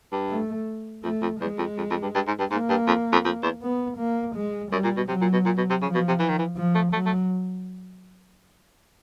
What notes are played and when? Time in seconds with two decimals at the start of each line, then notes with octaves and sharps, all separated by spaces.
0.12 G2
0.29 A3
1.03 F2 A3
1.22 F2
1.40 E2 G#3
1.59 F2
1.78 F2
1.90 F2
2.02 G2
2.15 G2
2.27 G#2
2.39 G2
2.51 G#2 A#3
2.69 G2
2.87 F2
3.12 F2
3.25 F2
3.43 E2
3.62 B3
3.98 A#3
4.35 G#3
4.72 F#2 G3
4.84 A#2
4.97 B2
5.08 C3 F#3
5.21 A#2
5.33 B2
5.45 A#2
5.57 B2
5.70 C3
5.82 C#3 F3
5.95 B2
6.08 C3
6.19 E3
6.29 D#3
6.39 E3
6.56 F3
6.75 A3
6.92 F#3 A3
7.06 A3